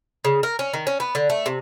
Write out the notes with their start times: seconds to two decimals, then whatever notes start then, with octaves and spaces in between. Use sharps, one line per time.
0.25 C#3
0.43 A#4
0.59 C#4
0.73 D#3
0.87 C#4
1.00 B3
1.15 D3
1.30 A3
1.46 C3